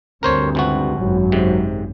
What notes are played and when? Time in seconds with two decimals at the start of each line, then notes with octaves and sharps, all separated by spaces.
0.23 D2 G2 C4 A#4 C5 C#5
0.55 C#2 C3 F#4
0.98 G#1 F#2 F#3
1.32 G#2 C3